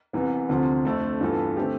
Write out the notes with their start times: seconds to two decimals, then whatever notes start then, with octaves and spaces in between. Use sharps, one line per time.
0.13 C2 C3 E3 B3
0.49 D2 C3 F3 C4
0.85 F2 D3 A3 C4
1.21 G2 E3 B3 F4 A4
1.57 D3 A3 C4 G4